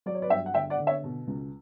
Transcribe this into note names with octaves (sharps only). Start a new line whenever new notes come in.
F#3 D5
C#5
B4 D5
G2 E5 G5
F#5
D3 E5 G5
D5 F#5
D3
C#5 E5
B2
C#2